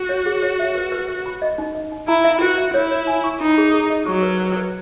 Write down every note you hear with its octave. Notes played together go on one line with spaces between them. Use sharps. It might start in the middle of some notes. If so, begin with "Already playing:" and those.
Already playing: F#4
C#5
G#4
C#5
E5
B4
B4
B4
B5
D#5
D#4
D#5
D#4
E4 A#5
E5
F#4 B4
E5
E4 C#5
C#5
G#5
C#6
D#4 E4
G#4
G#4
D#5
F#3 C#6
B4
B4
B4